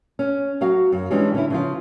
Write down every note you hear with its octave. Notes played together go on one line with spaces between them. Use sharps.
C#4
F#3 F#4 F5
F#2
E3 G3 G#3 C#4 D4 F4
D3 C#4 E4
C#3 F3 F4